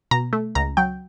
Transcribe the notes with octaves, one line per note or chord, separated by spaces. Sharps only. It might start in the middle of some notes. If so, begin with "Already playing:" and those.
B2 A#5
A3
C#2 A#5
F#3 G5